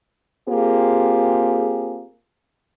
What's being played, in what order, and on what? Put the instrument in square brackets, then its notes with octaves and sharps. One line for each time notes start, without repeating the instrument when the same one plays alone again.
[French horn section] A#3 C4 F4 G4 G#4